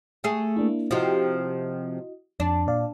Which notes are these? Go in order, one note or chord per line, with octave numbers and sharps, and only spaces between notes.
A3 G#4
A#3 D4 E4
C3 F3 E4 F#4 D#5
F2 D4
A#2 D5 F5